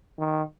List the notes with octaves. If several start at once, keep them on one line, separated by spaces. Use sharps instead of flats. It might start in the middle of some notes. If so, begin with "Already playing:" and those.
D#3